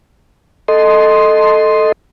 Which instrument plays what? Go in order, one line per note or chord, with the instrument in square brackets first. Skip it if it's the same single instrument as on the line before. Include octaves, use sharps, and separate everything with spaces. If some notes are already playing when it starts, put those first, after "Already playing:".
[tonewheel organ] A4 D#5 C6